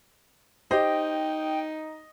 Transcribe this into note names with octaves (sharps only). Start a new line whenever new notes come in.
D#4 G4 C5 D#5 G5